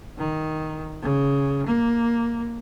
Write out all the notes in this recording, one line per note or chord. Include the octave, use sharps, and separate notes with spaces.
D#3
C#3
A#3